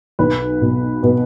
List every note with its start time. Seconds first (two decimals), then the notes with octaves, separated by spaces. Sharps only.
0.19 B1 B4
0.61 B2
1.03 B2